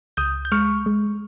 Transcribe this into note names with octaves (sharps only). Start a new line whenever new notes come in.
C#2 D#6 G6
G6
G#3 C#6 F6
G#3